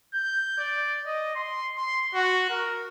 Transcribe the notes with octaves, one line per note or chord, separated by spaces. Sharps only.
G6
D5
D#5
C6
C6
F#4
A#4